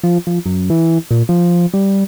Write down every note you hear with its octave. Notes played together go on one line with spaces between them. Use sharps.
F3
F3
F#2
E3
A#2
F3
G3